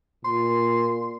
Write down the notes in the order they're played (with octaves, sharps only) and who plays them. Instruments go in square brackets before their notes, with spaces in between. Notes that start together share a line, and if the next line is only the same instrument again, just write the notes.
[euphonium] A#2 [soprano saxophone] C6